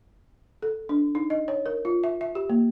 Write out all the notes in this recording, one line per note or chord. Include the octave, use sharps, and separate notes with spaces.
A4
D4
D#4
D#5
C#5
A#4
F4
E5
E5
G4
A#3